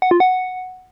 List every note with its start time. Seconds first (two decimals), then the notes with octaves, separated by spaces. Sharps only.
0.02 F#5
0.11 F4
0.20 F#5